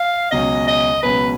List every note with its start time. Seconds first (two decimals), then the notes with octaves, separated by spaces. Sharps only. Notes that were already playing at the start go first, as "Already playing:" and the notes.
Already playing: F5
0.31 C#2 B2 F#3 C#4 D#5
0.68 D#5
1.03 C#2 B2 F#3 C#4 B4